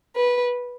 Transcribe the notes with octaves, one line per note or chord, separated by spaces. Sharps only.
B4